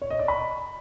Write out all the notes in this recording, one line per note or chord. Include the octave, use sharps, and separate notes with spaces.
C#5
D#5
D5
B5